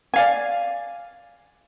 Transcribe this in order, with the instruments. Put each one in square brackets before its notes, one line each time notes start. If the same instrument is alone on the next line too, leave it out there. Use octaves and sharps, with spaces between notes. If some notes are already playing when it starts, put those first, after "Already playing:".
[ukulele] D5 F5 G#5